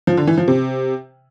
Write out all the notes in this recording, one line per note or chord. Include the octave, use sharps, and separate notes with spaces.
F3
D3
E3
F3
C3